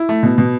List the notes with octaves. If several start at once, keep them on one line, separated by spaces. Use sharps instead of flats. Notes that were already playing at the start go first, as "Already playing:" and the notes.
Already playing: E4
A3
B2
B2